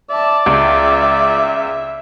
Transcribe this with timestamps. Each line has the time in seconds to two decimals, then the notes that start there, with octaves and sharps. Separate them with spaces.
0.10 D5 E5 A5
0.46 C#2 E5